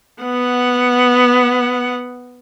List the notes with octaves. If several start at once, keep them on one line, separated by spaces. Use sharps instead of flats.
B3 F#5